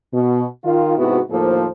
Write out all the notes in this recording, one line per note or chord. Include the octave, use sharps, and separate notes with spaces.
B2
D#3 F4
G#2 C3 B3 E4 F#4
D#2 A2 F3 A#3 A4 C5